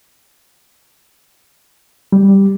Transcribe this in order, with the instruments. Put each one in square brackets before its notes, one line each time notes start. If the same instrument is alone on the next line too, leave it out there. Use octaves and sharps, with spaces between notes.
[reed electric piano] G3